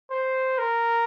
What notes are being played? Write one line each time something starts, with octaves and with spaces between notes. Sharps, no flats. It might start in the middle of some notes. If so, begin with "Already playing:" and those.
C5
A#4